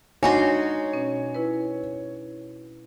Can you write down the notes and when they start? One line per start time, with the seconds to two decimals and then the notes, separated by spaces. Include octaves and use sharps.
0.23 G#3 D4 D#4 F#4 C#5 G#5 C6
0.93 B2 C#4
1.34 E4 B4